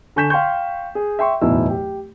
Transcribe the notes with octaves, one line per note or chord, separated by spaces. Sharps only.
D3 G#5 C#6 G6 B6 E7
F5 G5 C6 C#6 G6
G#4
E5 G5 C6 C#6
D1 E2 B2 D#4 E4 E6
G4